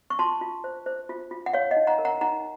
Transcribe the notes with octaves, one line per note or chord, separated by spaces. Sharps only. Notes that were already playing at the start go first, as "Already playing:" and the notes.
C#6
F4 A5 C6
F4
C5
C5
F4
F4
F#5
C#5 F5
D#5 F#5
D#4
F#5 A#5
A#4
F#5 A#5
D#4 F#5 A#5